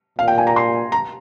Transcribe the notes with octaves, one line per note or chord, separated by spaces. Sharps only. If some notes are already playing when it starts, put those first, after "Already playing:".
A#2 F5
G5
G#5
A#5
C6
A#5